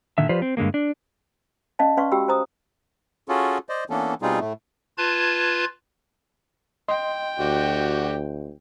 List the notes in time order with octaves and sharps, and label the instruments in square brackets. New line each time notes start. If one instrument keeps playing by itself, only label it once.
[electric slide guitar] A#2 D3 D#3 E5
F3 F4 G4 B4 C5 D5
C4
G2 D3 G#3 A#3
D4
[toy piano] C#4 D5 D#5 F5 A5
C#4 B4 D5 F5 C6 C#6
F#4 G4 G5 B5 E6
C5 A#5 D#6
[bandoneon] C#4 F4 F#4 G#4 A4
C5 D5 D#5
E3 A#3 B3 C#4 D4 A4
B2 G3 C4 D#4 F4 G#4
A2 A3
[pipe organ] F4 B4 A5 G#6
[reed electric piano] D#5 C6 [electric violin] G5
[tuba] D2 [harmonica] F#4 G4 D5